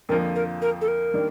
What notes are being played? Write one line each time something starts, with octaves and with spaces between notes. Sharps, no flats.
F2 D3 F3 A#3 A#4
A#4
A#4
A4
A#4
D#3 G3 A#3 D4